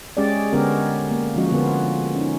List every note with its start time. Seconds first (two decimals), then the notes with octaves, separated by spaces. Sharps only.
0.17 G#3 C#4 G4 G#4 D5
0.53 D3 G#3 B3 C#4 G4 A#4
1.11 A#3
1.36 F3 G#3 C#4 F#4 D#5
1.52 D3 B3 F4 A#4
2.16 C#4 D#4